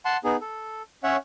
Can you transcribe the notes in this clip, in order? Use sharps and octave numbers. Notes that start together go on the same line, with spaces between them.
F#5 A5 C6
B3 D#4 G#4
A4
C#4 C#5 E5 F#5